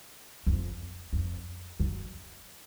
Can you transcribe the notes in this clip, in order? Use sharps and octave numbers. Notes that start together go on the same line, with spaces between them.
F2
F2
F#2